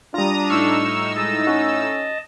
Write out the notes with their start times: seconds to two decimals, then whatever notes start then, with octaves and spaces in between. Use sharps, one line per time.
0.14 G3 D4 F4 A#5 D#6
0.49 A2 D#4 C#6 E6 F6
1.16 G#3 D#5 A5
1.47 C#4 F#4